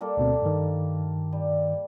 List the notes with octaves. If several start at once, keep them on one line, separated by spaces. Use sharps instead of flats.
G3 A#3 A4
D2 B2 C4
G2 D#3
G3